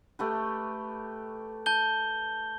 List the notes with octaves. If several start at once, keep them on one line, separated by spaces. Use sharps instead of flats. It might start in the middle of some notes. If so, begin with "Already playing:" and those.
A3 G4 B4
A5 G6 G7